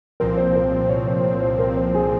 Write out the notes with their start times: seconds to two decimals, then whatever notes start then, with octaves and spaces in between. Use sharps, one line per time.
0.20 C2 A#2 F3 C4 A#4
0.37 C5
0.56 A#4
0.72 C5
0.89 C#5
1.07 C5
1.42 C5
1.59 A#4
1.77 C5
1.94 G#4